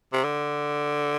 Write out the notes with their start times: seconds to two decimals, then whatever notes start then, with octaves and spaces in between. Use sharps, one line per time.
0.13 C3
0.24 D3